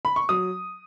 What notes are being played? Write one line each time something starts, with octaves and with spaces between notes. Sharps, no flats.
B5
C#6
F#3 D#6